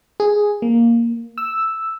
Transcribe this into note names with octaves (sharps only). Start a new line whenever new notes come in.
G#4
A#3
E6